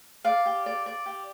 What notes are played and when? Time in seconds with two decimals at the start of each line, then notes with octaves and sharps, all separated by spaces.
0.24 D5 F5
0.46 G4
0.66 D5
0.86 D5
1.06 G4